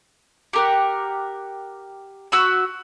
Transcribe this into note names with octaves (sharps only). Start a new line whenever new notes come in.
G4 A#4 F#5
F#4 B5 E6